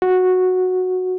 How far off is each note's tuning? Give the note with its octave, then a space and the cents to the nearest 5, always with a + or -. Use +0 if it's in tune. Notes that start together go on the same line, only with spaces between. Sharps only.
F#4 -10